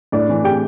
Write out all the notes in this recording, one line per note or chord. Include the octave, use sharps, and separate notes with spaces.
A2 D4 D5
E3
A2 G4 G5